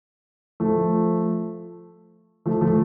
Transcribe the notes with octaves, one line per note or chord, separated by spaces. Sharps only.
F3 A3
F3 A3
F3 A3